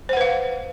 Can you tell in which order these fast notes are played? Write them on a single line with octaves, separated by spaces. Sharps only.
C5 F#5 B4 F5